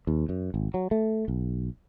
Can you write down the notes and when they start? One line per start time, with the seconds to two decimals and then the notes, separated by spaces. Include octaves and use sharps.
0.07 D#2
0.29 F#2
0.54 G#1
0.74 F#3
0.91 A3
1.28 B1